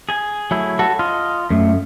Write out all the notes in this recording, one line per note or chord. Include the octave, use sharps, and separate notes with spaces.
G#4 G#5
F#3 A3 E4
F#4 A4
F4 D#5
F#2 A3